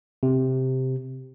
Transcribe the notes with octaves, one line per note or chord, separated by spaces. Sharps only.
C3